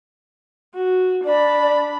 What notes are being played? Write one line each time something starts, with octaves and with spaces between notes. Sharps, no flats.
F#4
D4 D5 B5